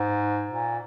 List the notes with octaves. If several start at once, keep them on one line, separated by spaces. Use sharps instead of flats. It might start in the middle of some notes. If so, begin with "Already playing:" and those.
Already playing: G#2
A#2